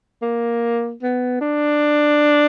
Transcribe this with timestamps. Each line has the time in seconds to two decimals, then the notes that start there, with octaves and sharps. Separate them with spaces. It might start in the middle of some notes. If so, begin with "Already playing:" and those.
0.22 A#3
1.03 B3
1.41 D4